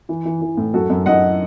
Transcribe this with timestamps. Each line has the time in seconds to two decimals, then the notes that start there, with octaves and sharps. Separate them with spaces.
0.09 E3
0.25 E3
0.41 E3
0.57 A2
0.74 F#2 F#4 A4
0.90 F#2
1.06 F#2 D#5 F#5